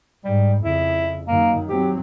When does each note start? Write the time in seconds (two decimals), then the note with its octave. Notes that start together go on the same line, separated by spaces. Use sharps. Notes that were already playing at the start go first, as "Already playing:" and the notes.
0.25 G#2 G3
0.63 F2 C#3 E4
1.28 F#2 D#3 A#3
1.69 F#3 C4 G4